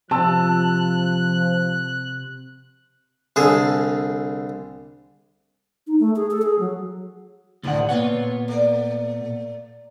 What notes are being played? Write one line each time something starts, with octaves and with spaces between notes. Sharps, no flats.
C3 F3 A5 E6 F#6
C2 D3 G#4 A4
D#4
A3
G#4
A4
G#4
F#3
D2 A2 D#3 F3 G3 F#5
A#2 B3 F4 C#5 F#5
A3 D5